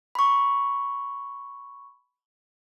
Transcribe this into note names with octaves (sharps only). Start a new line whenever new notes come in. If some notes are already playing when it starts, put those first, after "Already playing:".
B5 C#6